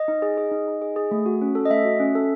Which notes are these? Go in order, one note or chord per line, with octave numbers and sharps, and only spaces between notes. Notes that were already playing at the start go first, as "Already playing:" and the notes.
Already playing: D#5
D#4
G#4
G#4
D#4
D#4
G#4
G#4
A3
F#4
C#4
A4
D#5
A3 E5
F#4
C#4
A4